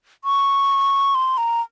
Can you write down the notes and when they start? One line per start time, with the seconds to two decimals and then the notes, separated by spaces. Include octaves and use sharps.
0.24 C#6
1.15 C6
1.38 A#5